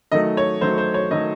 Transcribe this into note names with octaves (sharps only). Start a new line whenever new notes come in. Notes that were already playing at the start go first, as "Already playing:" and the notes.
D#3 F#3 A3 D#5
C#5
D#3 F#3 A3 C5
C5
C#5
D#3 F#3 A3 D#5